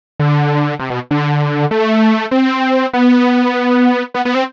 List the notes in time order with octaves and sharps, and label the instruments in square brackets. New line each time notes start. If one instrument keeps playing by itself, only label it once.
[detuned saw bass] D3
C3
B2
D3
A3
C4
B3
B3
B3
C4